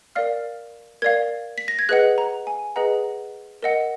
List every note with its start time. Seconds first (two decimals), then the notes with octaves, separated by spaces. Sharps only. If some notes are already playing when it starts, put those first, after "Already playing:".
0.15 A#4 D5 F5 F6
1.02 A#4 D5 F5 G#6
1.58 B6
1.68 A#6
1.79 G#6
1.89 G#4 B4 D#5 F#5 F#6
2.18 A#5
2.47 G#5
2.76 G#4 B4 D#5 F#5 A#5
3.63 A#4 D#5 F#5